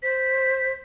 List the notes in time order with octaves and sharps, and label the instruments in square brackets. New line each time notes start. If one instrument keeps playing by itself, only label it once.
[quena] C5 [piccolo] B6